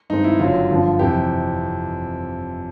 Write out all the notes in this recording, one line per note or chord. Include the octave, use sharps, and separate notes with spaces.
G2 D#3 G#3 C4 D#4
E4
F#1 F#2 D3 F#3 F4
G2 D3 F3
F2 C3 E3 G4